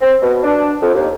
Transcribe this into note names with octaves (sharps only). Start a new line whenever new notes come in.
C4
B2
D4
F2
D#2